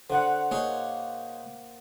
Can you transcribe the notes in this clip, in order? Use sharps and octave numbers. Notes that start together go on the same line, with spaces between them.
D3 C5 F#5
A#3 D#4 G#4 C#5